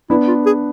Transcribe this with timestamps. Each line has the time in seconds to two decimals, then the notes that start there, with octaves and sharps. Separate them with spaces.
0.10 B3 D4 E4
0.28 F4
0.46 G#4